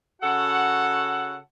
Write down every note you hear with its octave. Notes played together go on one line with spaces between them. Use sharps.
C#3 F#4 A4 F#5